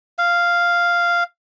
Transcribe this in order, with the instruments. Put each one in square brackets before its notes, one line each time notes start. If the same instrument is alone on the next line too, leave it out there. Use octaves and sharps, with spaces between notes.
[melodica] F5